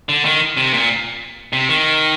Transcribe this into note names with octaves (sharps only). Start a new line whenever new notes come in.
D3
D#3
C3
A#2
C3
D#3